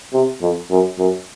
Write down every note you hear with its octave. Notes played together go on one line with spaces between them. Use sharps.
C3
F2
F#2
F#2